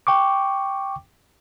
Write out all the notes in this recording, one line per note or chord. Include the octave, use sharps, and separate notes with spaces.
G5 C#6 D6